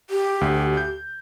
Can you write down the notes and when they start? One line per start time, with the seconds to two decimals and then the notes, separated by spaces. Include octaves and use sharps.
0.10 G4
0.41 D2
0.77 G6